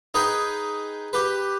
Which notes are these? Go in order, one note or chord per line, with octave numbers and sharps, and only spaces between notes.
D#4 G#4 B4 G5
G4 B4